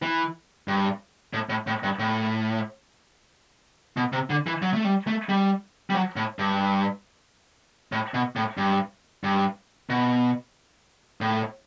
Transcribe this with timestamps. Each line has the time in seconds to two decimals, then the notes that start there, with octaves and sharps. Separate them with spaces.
0.03 E3
0.68 G2
1.34 A2
1.49 A2
1.67 A2
1.83 G2
1.99 A2
3.97 B2
4.13 C3
4.30 D3
4.47 E3
4.62 F#3
4.74 A3
4.85 G3
5.07 A3
5.29 G3
5.90 G3
5.94 F#3
6.16 A2
6.39 G2
7.92 A2
8.14 B2
8.36 A2
8.58 G2
9.24 G2
9.90 B2
11.21 A2